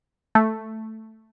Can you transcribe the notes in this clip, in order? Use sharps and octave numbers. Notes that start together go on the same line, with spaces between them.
A3